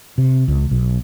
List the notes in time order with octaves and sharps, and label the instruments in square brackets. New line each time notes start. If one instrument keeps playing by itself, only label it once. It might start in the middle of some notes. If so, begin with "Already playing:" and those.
[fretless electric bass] C3
C#2
B1